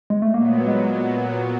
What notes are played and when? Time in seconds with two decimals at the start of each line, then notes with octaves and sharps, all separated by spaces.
0.10 G#3
0.22 A3
0.34 A#2 F#3 A#3 B3
0.67 G#3